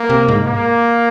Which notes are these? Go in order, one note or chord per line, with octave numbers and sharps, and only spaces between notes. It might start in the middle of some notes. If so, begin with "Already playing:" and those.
Already playing: A#3
C3
G#2
A#3